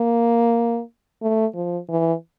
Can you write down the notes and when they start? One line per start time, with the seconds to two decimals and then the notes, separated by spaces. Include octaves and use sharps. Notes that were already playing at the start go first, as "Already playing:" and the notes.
Already playing: A#3
1.22 A3
1.55 F3
1.89 E3